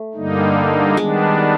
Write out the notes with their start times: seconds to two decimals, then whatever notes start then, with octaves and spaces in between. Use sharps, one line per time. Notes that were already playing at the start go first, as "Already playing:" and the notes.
Already playing: A3
0.14 G2 D3 G3 A#3 D#4
0.97 D#3 G3 G#3 B3 D4